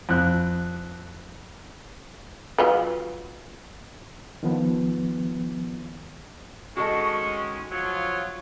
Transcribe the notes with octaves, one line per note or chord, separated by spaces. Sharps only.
F2 F#6
F#3 F4 B4
D#3 F3 B3
D#3 G#3 C#4 F#4 A4 D#5 C#6
F3 F#3 F4 C#5